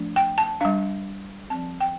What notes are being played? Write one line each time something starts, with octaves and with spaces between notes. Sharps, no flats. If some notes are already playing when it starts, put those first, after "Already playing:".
Already playing: F3 A3 D4
G5
A5
G3 D4 F5
F3 C4 A5
G5